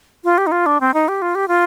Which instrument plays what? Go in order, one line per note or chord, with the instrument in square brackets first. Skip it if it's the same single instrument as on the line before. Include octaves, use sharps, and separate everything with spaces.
[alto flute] F4
G4
D#4
F4
D4
C4
D#4
G4
F4
G4
F4